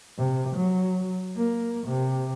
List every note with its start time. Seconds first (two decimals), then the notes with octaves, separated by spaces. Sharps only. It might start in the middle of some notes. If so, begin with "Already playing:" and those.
0.17 C3
0.55 F#3
1.36 A#3
1.87 C3